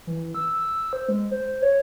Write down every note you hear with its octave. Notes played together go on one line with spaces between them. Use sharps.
E3
E6
C5
G#3
C5
C#5